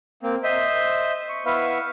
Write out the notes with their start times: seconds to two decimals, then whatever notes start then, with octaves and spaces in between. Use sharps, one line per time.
0.23 A#3 C4
0.44 C5 D#5 E5 C6
1.29 C#6
1.46 B3 E4 B4 E5 F5 C#6